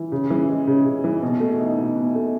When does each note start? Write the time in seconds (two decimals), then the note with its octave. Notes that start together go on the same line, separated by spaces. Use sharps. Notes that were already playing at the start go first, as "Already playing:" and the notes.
Already playing: E3
0.12 C#3
0.30 E3
0.49 G#3
0.67 C#3
0.85 C#3
1.04 E3
1.22 B2
1.40 A3
1.59 D#4
1.78 B2
1.95 B2
2.15 A3